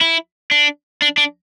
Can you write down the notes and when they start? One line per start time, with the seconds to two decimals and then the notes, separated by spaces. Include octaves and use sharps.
0.01 E4
0.51 D4
1.02 D4
1.17 D4